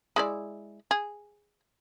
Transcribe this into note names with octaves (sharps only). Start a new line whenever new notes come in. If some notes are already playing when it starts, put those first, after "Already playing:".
G#3 E4 D5
G#4